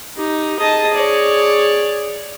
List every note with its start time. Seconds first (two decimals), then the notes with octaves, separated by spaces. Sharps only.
0.17 D#4 G4
0.60 G#4 D#5 A5
0.94 C#5 D5